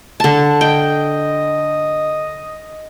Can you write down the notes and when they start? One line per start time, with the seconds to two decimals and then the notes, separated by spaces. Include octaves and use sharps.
0.20 D3 A5
0.61 D#5 G5